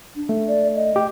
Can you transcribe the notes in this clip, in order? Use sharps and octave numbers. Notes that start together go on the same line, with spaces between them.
D4
A3
D5
D#5
G4